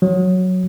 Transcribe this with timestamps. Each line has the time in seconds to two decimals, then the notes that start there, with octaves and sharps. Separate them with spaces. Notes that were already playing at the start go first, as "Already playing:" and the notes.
0.02 F#3